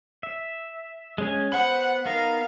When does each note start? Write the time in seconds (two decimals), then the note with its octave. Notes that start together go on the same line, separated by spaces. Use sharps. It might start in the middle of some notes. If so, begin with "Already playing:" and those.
0.23 E5
1.18 G#3 C#4 G#5
1.52 B3 C5 F#5 B5
2.06 B3 D#4 A#4 F5